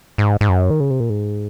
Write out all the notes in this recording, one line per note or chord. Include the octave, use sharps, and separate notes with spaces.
G#2
G#2
F#2
D#3
C#3
C3
A#2
G#2